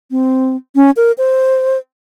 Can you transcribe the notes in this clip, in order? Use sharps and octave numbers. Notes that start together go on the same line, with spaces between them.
C4
C#4
A#4
C5